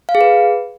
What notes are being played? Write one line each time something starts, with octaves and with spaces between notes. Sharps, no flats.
F5
G#4
B4